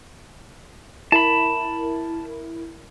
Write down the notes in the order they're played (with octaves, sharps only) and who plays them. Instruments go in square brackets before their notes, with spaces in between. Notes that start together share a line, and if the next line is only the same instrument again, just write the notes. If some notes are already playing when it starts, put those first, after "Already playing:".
[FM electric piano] E4 A#4 [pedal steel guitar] A5 B5